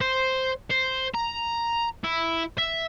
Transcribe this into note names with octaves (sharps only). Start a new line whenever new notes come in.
C5
C5
A#5
E4
E5